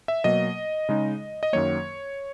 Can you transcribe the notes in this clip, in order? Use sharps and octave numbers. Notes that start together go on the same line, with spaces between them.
E5
B2 F#3 A#3 D#5
C#3 G#3 D#4
D#5
F#2 D#3 F#3 A#3 C#5